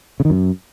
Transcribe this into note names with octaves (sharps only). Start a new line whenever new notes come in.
C#3
D#3
F#2